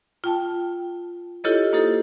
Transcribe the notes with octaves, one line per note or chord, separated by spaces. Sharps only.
F4 G5 A5
E4 F4 G4 A4 C#5 D#5
A#3 D#4 G4 A4 C5